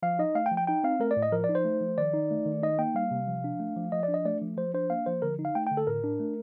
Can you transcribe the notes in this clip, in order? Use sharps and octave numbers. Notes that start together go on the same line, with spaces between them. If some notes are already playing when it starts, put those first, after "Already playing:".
F3 F5
D#4 D#5
A3 F5
G5
F3
G5
D#4 G5
C4 F5
A3 A#4
D5
A2
D#5
F3 A#4
D5
D#4
C5
A3
F3
D#3 D5
D#4
A3
D#3
D#4 D#5
A#3 G5
G3 F5
C3
F3
D4
A3
F3
F3 D#5
D5
D4
D#5
A3 D5
F3
F3 C5
D4 C5
A#3 F5
F3 C5
D3 A#4
D#4
F5
A3 G5
G5
D3
A4
A2 A#4
D4
A3